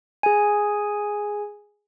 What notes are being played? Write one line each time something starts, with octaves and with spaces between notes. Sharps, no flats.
G#4 G#5